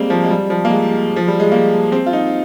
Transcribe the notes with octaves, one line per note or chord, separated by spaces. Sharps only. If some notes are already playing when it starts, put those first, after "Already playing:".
Already playing: G3 G#3 A#3 C4
F3
G#3
G3
F3
A#3
G#3
F3
G3
G#3
A#3
C4
F4
D#4